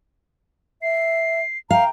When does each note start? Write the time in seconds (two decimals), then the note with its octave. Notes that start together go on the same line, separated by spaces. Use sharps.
0.82 E5 C7
1.71 F5 G5 A#5